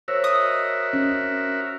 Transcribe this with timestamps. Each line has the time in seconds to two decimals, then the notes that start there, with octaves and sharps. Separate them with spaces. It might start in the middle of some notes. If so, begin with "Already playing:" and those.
0.08 F#4 A#4 C5 C#5 E5 E6
0.24 D#5 D#6
0.93 C#4